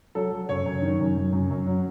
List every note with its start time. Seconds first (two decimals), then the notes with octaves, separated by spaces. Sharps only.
0.15 F#3 A4
0.32 F#3
0.49 F#2 C#5
0.66 F#2
0.82 D#3
1.00 F#2
1.16 F#2
1.32 F#2
1.50 F#2
1.67 F#3